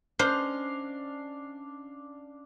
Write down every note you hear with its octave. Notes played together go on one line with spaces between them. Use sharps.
C#4 D4 C5 D#5 F5